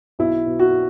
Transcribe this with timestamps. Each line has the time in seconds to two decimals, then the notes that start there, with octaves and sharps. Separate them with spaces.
0.19 B1 E4
0.46 B2
0.59 F#4